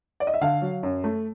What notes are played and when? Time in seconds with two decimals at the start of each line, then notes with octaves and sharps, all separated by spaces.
0.20 D5
0.27 D#5
0.34 E5
0.41 D3 F5
0.62 F#3
0.83 F#2
1.04 A3